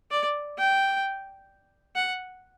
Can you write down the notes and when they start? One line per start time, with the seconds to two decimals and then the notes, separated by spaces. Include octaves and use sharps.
0.11 D5
0.58 G5
1.96 F#5